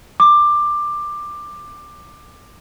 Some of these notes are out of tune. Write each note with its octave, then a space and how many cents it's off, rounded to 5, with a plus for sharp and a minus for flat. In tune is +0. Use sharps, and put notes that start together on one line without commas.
D6 +15